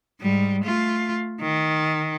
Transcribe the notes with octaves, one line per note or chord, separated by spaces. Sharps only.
G#2 G3
A3 F4
D#3